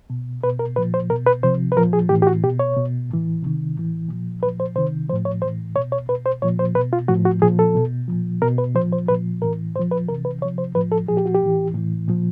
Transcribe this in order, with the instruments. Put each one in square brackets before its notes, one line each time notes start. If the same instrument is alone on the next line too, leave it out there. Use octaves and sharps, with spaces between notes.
[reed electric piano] B2
B2 B4
A#4
A#2 F3 B4
C5
B2 A#4
B4
C3 F3 C5
B4
A#2 F3 A#4
G#4
A2 E3 G4
G4
F#4
B2 G4
C#5
B2
A2 E3
C3 D#3
A2 E3
A#2 F3
A#2 F3 B4
C5
C3 D#3 C5
F3 C5
A2
C#5
A2 E3 C5
B2 C#5
C#5
B2 B4
C5
A#2 F3 C#5
C5
B2 B4
F4
A2 F3 F#4
F#4
A#2 F3 G#4
A4
B2
A#2 F3
B2 A#4
B4
A#2 F3 C5
C5
A#2 F3 B4
A2 E3 A#4
A#2 C5
F3
B4
C3 E3 A#4
B4
C3 C#5
F3
C5
A2 F3 B4
A4
A#2 F3 G#4
G4
F#4
G4
A2 E3
A2 E3
A#2 F3